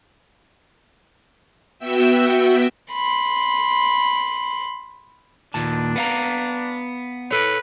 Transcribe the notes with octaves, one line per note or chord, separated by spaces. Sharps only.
B3 F#4 E5 G5 E6
B5 C6
D#2 A#2 D4 A5
B3 F5 A#5
A4 B4 C#5